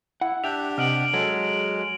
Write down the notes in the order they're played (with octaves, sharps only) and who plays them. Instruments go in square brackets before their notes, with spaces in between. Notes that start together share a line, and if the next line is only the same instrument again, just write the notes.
[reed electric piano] E4 [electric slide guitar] F#5
[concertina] D4 G4 [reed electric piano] E5 G5 F#6 [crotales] F7
[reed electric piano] C3 D#5 [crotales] F6 D7 F#7
[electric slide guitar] F#3 [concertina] G#3 [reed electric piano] G#4 A4